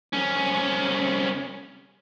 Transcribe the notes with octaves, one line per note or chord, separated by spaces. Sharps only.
C2 C#4